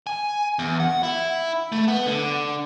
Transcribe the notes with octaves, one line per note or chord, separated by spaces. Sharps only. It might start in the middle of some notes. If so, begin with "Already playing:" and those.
G#5
E2
F#5
E4
A3
B3
D3